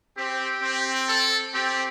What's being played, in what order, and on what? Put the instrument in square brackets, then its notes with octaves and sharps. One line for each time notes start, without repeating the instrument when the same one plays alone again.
[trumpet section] C4 [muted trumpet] G4
[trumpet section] C4
[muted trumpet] A4
[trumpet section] C4 [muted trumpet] G4